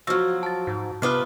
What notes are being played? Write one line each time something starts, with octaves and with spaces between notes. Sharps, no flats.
F3 F#3 F#4 E6 F6
A5 A6
G#2
C3 B3 F4 B4 E5 D6 D#6